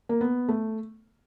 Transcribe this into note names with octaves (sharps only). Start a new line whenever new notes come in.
A#3
B3
A3